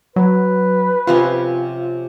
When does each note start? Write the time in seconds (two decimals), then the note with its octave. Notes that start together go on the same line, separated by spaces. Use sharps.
0.16 F#3 B4
1.07 C3 F3 C#4 F4